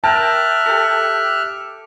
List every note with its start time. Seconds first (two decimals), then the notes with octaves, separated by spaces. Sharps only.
0.04 A#4 E5 G5 A5 F6 F#6
0.66 G4 A4